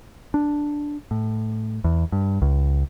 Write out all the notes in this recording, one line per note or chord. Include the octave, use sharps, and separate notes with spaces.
D4
A2
E2
G2
C#2